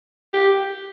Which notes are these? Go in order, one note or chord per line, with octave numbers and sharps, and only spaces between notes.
G4